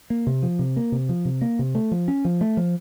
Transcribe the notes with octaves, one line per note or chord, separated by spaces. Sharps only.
A#3
C3
F3
C3
A#3
C3
F3
C3
A#3
C3
A3
F3
C#4
F3
A3
F3